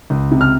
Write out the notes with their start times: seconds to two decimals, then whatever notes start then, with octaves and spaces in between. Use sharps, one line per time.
0.10 C#2
0.31 C3
0.41 F6